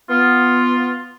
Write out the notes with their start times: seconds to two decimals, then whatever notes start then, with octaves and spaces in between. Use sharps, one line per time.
0.10 B3 F4